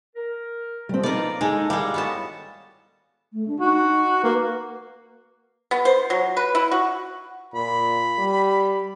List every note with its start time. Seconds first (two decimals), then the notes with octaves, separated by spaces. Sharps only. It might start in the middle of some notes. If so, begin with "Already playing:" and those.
0.16 A#4
0.89 G2 A#2 F3 G3 C4
1.03 A#3 B3 D#4 B4 D5
1.41 G#3 D#4 G#4 A4 A5
1.70 G3 G#3 G4 G#4 A#4 F5 F#5
1.94 D2 A2 D3 B3 F#4 A5
3.33 A3
3.48 D4
3.60 D#4 F#4
4.23 A#3 B4
5.71 B3
5.85 C5
6.10 F#3
6.37 B4
6.55 E4
6.71 F#4
7.54 A#2 B5
8.19 G3